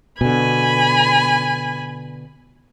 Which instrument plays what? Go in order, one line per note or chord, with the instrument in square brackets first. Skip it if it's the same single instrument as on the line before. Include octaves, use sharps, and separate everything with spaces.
[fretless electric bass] B2 D3 [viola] G#5 B5